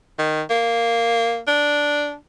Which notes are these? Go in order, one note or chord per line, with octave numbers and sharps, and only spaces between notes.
D#3
A#3
D4